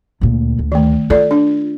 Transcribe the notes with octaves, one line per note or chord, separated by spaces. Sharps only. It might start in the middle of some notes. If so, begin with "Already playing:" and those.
D2 A#2
D2
D#3 A3
F4 A4 D5
D4